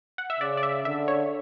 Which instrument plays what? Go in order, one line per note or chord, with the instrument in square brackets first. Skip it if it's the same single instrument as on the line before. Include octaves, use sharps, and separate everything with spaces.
[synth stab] F#5
E5
[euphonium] C#3 [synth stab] D5
[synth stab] D5
E5
[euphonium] D3 [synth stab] E5
[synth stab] C#5